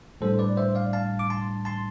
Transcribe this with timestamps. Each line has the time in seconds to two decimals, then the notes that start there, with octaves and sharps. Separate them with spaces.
0.21 A2 G3 D4 A4 C5
0.39 B4 D5
0.57 C5 E5
0.75 D5 F5
0.93 F5 A5
1.19 D6
1.30 A5 C6
1.65 A5 C6